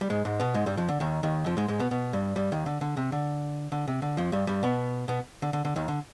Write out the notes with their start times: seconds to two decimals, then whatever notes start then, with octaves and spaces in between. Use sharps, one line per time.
0.01 G3
0.10 G#2 G#3
0.25 G#2 G#3
0.40 B2 B3
0.54 G#2 G#3
0.66 G2 G3
0.77 F2 F3
0.88 D3
1.00 D#2 D#3
1.23 D#2 D#3
1.46 F2 F3
1.57 G#2 G#3
1.68 G#2 G#3
1.79 B2 B3
1.91 B2 B3
2.13 G2 G3
2.36 G2 G3
2.52 D#2 D#3
2.66 D3
2.81 D3
2.97 C3
3.12 D3
3.72 D3
3.88 C3
4.02 D3
4.17 F2 F3
4.32 G2 G3
4.47 G2 G3
4.63 B2 B3
5.08 B2 B3
5.42 D3
5.53 D3
5.65 D3
5.76 D#2 D#3
5.88 D3